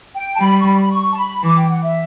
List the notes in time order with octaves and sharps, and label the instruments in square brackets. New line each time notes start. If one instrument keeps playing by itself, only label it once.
[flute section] G5
A5
[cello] G3 [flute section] B5
[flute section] C#6
B5
B5
C#6
A5
B5
[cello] E3 [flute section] D6
[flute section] G5
F#5
E5